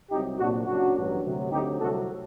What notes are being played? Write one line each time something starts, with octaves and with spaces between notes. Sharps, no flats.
C2 C3 F#3 D#4 G4
C2 A#2 F#3 D4 F#4
F#1 F#2 F#3 D4 F#4
A1 G2 F#3
D2 C3 F#3
D2 C3 F#3 D#4 G4
C2 C3 F#3 F#4 A4